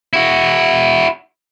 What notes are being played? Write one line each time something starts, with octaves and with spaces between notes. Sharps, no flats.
E4 F#4